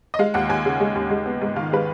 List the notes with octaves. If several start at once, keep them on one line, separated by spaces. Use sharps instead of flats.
D#5
G#3 F5
D#2 F#5
D#2 G#5
C#3
G#3
D#2
G#3
B3
G#2
D#3 F5
G#3 B4